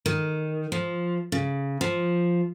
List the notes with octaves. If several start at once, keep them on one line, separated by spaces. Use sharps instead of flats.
D#3
F3
C#3
F3